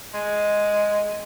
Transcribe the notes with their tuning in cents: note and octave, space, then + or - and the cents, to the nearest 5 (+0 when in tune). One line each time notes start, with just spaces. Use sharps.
G#3 +0